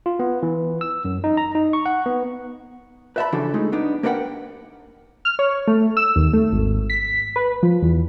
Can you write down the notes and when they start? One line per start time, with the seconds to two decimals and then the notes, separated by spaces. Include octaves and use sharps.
0.06 F4
0.19 B3
0.43 E3
0.81 E6
1.05 F#2
1.24 D#4
1.37 A#5
1.55 D#4
1.73 C#6
1.86 F#5
2.06 B3
3.16 B4 D5 E5 F#5 A5 B5
3.32 C#3 E3 F3 D4 F#4 A4
3.54 G#3 A3 D#4
3.72 B3 D4 D#4
4.03 A#3 A#4 B4 D5 F#5 G5
5.25 F6
5.39 C#5
5.67 A3
5.97 E6
6.16 D#2
6.33 A3
6.52 G#1
6.90 B6
7.36 B4
7.63 F3
7.82 E2